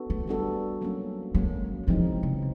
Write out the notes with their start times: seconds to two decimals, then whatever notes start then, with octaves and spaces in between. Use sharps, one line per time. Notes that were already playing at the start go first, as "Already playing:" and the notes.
Already playing: B3 D4 F#4 A4
0.10 A3
0.28 G3 B3 D4 F#4 A4
0.81 F#3 A#3 C#4
1.34 F#3 G#3 A#3 C#4
1.87 C3 E3 F3 G#3 C4 D#4
2.23 C#3